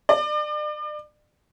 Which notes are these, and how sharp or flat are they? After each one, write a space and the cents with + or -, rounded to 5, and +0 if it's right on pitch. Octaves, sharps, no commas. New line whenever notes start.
D5 +40